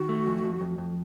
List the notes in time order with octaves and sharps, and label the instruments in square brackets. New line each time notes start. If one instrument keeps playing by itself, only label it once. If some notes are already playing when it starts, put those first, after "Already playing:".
Already playing: [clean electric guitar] D#3 [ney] F#4
[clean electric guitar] A3
F2
F2
F2
F2